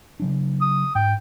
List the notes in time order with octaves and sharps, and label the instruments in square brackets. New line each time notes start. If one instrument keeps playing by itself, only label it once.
[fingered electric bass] C#3 F#3 D4
[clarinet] D#6
[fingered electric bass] G#2 [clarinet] G5